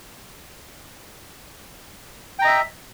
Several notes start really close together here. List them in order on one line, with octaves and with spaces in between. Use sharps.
G5 A#5 D#5 E5